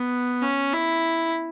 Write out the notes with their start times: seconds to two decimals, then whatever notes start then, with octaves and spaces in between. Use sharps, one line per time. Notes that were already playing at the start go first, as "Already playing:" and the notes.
Already playing: B3
0.42 C#4
0.73 E4